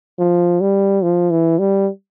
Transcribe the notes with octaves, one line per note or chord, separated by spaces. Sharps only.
F3
G3
F3
E3
G3